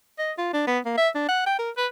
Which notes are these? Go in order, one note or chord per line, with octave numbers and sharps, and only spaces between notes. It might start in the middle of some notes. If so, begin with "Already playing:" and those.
D#5
F4
D4
B3
A#3
E5
D4
F#5
G5
A#4
B4